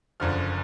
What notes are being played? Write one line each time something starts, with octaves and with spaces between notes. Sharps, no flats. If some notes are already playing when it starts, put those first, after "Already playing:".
F#1 F#2 D3 F3 F6